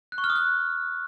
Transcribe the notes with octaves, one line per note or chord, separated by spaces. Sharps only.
F#6
C#6
F6
D#6
F#6